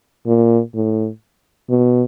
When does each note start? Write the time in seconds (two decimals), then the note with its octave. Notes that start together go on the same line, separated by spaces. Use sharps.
0.26 A#2
0.74 A2
1.70 B2